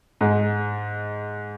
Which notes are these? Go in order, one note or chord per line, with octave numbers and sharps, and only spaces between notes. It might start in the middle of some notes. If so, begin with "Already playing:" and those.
G#2 G#3